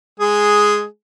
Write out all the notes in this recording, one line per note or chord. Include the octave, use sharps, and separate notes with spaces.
G#3 G#4